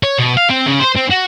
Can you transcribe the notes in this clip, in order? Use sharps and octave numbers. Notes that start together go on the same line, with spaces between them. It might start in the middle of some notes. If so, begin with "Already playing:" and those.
C#5
B2
F5
C4
C#3
C5
C4
F#4